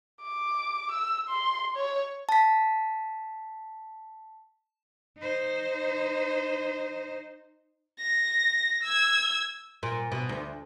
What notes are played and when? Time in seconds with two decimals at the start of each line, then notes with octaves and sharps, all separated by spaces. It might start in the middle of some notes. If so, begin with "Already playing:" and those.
0.23 D6
0.91 E6
1.29 C6
1.77 C#5
2.29 A5 B6
5.18 D#4 C5
8.00 A#6
8.83 E6 G#6
9.83 A#2
10.12 B2
10.29 D2